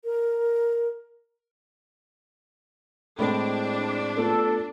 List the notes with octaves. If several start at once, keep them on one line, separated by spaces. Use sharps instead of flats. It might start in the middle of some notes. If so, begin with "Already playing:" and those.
A#4
A2 G#3 C4 D4 A4 B5
A3 B3 F4 A4